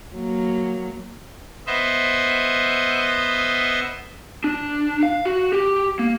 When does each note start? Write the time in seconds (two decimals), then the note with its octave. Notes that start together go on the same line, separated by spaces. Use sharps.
0.15 F#3 A#3
1.67 B3 C5 D#5 E5
4.44 D4
5.03 F5
5.25 F#4
5.53 G4
5.99 A#3